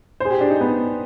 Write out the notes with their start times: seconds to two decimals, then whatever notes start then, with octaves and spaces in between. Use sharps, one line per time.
0.20 G#4 C5
0.31 G4
0.41 D4
0.50 D#4
0.61 B3